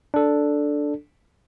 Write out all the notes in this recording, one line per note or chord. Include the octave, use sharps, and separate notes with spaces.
D4 A4